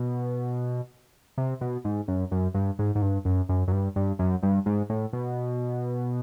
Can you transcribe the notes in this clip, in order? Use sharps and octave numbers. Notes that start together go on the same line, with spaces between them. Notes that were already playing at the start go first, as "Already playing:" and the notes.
Already playing: B2
C3
B2
G#2
F#2
F#2
G2
G#2
G#2
G2
F#2
F#2
F#2
G2
G2
F#2
G2
G#2
A2
B2